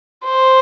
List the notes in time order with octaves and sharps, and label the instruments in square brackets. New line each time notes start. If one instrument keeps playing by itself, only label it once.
[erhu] C5